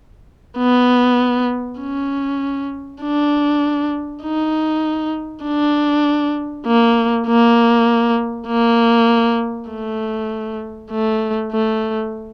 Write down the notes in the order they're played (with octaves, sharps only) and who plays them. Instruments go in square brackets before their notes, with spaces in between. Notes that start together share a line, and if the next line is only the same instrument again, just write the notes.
[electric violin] B3
C#4
D4
D#4
D4
A#3
A#3
A#3
A3
A3
A3